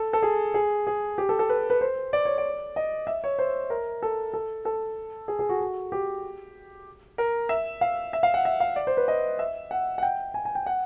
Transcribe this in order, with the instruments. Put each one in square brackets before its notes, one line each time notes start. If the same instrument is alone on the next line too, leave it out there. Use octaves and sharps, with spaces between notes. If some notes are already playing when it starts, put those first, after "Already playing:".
Already playing: [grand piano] A4
A4
G#4
G#4
G#4
G4
A4
A4
B4
B4
C5
D5
C#5
D5
D#5
E5
C#5
C5
A#4
A4
A4
A4
G#4
G#4
F#4
F#4
G4
A#4
E5
F5
E5
F5
F#5
E5
F5
D5
C5
B4
D#5
E5
F#5
F#5
G5
G#5
G#5
G5
F#5